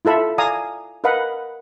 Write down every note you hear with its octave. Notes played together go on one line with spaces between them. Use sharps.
E4 F4 A4 E5 B5
D5 F5 G#5 A#5 D#6
A#4 B4 D#5 F5 F#5 B5